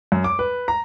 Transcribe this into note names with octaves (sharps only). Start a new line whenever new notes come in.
F#2
D6
B4
A#5